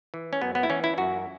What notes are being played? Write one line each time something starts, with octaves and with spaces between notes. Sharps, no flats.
E3
C#4
F#2 B3
B3
E4
E3 C#4
E4
F#2 F#4